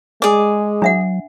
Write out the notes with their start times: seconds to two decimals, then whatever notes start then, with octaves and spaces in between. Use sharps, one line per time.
0.22 G#3 G#4 D5 D#5 D6
0.82 F#3 D4 E5 F#5